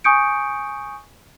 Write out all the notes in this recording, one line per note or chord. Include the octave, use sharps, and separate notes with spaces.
G#5 C#6 D#6 G6 C#7 D7